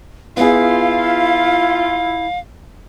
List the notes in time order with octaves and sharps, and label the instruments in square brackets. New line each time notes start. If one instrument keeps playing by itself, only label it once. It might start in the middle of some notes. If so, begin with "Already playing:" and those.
[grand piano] B3 G#4 [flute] E4 [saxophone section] F4 [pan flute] F5